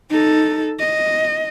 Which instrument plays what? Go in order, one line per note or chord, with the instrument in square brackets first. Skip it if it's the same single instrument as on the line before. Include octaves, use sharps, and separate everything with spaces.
[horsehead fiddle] D#4 A4
D#5